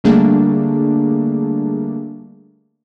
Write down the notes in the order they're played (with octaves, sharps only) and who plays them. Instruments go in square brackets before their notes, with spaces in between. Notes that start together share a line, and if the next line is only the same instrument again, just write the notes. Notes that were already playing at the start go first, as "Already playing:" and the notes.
[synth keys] D3 G3 A3 A#3 D4 G#4